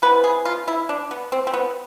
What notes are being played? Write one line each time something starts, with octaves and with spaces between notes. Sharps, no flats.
C3 E3 B3 B4
G#4
F4
E4
D4
B3
C4
C4
B3